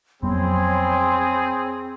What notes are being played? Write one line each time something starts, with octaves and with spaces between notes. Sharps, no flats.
F2 F#3 B3 C4 G#4 C#5 B5 C6